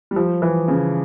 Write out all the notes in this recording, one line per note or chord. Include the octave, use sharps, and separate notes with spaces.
G3
F3
E3
C#3